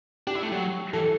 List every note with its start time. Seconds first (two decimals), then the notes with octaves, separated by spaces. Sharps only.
0.27 D4 G4
0.35 E4
0.43 A3
0.52 F#3
0.93 E3 A4